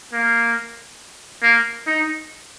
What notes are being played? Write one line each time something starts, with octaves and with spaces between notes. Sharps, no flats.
A#3
A#3
D#4